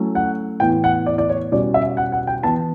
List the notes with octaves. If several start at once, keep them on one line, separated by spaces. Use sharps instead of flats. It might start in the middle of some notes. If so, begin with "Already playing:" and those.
Already playing: F#3 A3 C#4 E4
F#5
A2 E3 B3 G5
F#5
D5
D5
C#5
B2 G3 C#4 D5
E5
F#5
F#5
G5
E3 B3 E4 A5